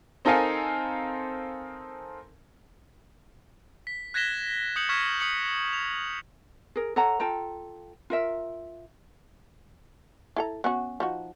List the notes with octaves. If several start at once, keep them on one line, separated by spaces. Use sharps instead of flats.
C4 D#4 A4 A#4 F5 G#5
B6
F#6 G#6 A#6 B6 E7 G7
D#6 G6 C#7 F#7
C#6 F6 G#6 B6 E7
D#6 C#7 F#7
F7
G#4 A#4
A4 C#5 F#5 A#5
F4 A4 G5 A#5
F4 A#4 E5
E4 A4 A#5
B3 C#4 F#4
F3 D#4 F#4